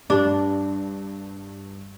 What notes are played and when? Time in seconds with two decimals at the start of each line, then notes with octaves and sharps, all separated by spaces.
0.10 G2 D4